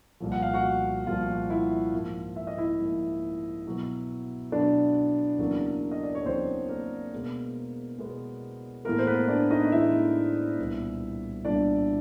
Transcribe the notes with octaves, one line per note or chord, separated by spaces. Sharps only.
C2 A#2 F3
F#5
F5
F#4 F#5
C2 A#2 F3 F4 F5
E4 E5
G#2 F3 A#3
E5
D#5
E4 E5
G#2 F3 A#3
B2 F#3 B3
B2 F#3 B3 D4 D5
E2 C#3 F#3 A#3
D#5
D5
C#5
E2 C#3 F#3 A#3 C4 C5
A#3 A#4
B2 G#3 B3
B2 G#3 B3
A2 E3 G#3 A#3 B3 A#4
C5
B3 B4
D4 D5
D#4 D#5
D#5
A2 E3 G#3 B3 E4 E5
C2 A#2 G3 B3
C2 A#2 G3 B3 D4 D5